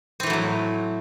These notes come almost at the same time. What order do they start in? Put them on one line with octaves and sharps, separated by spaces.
C4 E3 A3 F#3 A2